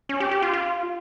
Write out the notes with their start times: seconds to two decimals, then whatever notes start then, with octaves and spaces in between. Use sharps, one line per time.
0.09 C#4
0.20 G4
0.31 G4
0.42 F4
0.53 F4